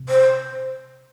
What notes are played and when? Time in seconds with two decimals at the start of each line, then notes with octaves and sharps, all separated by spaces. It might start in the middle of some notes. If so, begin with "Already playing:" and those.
Already playing: C3
0.09 C5